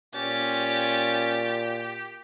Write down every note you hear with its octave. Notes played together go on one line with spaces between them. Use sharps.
A#2 C#4 G4 A6